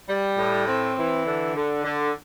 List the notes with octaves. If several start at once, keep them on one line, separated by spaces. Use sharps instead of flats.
G3
A2
C4
E3
D3
D3
D3